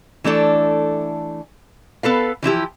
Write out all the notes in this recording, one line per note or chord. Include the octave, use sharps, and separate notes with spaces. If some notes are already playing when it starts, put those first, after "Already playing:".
E3 A3 D4 A4
B3 A4 B4 F5
E3 F3 E4 G4